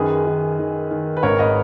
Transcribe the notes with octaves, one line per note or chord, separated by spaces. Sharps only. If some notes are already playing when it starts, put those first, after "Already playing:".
Already playing: F#2 D#3 G#4 B4
D#3
D#3
D#3
B4
G#1 A#4 C#5
B4 D#5